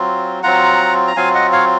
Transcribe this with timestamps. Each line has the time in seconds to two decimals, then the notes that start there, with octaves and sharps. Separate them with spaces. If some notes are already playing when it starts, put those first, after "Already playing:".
Already playing: F#3 C4 F4
0.43 F#3 C4 F4 F#5 A#5
1.07 A#5
1.16 F#3 C4 F4 F5 G#5
1.34 D#5 F#5
1.52 C#5 F5